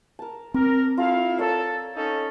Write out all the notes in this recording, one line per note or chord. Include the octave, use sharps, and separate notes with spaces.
A#4 A5
C4 A#4 D6
E4 F4 A4 F5
A4 A#4 C#5 D5
C#4 D#4 A4